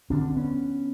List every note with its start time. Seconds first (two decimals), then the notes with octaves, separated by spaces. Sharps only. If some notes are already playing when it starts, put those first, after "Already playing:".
0.10 D2 D3 C4 D4
0.36 B3 C#4